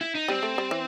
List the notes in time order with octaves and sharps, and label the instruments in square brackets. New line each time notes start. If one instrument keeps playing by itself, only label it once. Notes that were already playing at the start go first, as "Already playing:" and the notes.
[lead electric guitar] E4
D#4
[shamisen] G3 [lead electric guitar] C4
[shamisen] A3
G3
E3